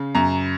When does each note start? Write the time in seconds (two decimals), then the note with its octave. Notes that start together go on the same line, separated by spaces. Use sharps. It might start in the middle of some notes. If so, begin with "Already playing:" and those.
Already playing: C#3
0.15 F#2 A#5